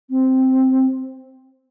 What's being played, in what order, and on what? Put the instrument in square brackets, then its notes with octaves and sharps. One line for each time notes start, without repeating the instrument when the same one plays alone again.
[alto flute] C4